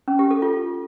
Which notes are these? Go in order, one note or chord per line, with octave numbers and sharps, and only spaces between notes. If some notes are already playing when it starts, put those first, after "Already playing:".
C#4
G4
A4
F4